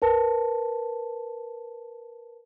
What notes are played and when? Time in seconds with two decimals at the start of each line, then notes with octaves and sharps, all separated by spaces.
0.02 A#4 B4 A5